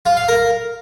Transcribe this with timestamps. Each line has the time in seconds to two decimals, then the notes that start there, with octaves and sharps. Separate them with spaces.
0.06 F4
0.17 F5
0.28 A#4